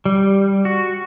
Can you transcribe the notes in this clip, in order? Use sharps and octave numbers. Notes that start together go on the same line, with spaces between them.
G3
F#4